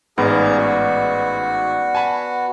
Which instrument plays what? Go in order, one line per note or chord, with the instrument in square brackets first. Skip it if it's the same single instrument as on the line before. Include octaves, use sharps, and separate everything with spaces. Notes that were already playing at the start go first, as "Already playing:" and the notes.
[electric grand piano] A1 G#2 [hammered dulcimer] B3 D5 [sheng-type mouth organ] G#4 F5 A#5
[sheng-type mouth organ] F#4
[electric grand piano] G#5 A5 B5